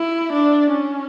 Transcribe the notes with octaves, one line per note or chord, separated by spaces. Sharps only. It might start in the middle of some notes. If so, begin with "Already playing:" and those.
Already playing: E4
D4
C#4